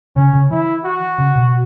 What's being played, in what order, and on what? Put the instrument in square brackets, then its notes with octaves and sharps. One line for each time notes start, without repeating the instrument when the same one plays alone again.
[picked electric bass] C#3 [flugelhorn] C#4
[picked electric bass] C#3
[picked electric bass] E3 [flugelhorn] E4
[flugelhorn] F#4
[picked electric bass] C#3
B2